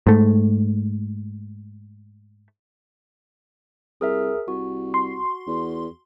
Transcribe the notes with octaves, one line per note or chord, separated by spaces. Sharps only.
G#2 A3
C2 G#4 A#4 E5
C2 F#4
C6
E2